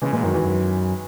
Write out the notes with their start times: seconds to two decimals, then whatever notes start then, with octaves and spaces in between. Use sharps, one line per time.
0.02 C#3 E3 G#3
0.12 A#2 E3 G#3
0.23 F#2 D#3 F#3
0.34 E2 E3
0.43 F#2